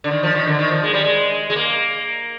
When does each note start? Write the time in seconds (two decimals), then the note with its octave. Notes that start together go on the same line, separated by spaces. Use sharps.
0.04 D3
0.11 D#3
0.23 F3
0.35 D#3
0.47 D3
0.59 D#3
0.71 F3
0.83 G#3
0.94 G3
1.04 G#3
1.50 G#3
1.56 A#3